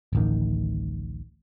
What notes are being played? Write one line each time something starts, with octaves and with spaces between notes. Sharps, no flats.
D1 A1 D#3